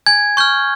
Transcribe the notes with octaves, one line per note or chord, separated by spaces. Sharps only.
G#5 G#6
C#6 F6 G6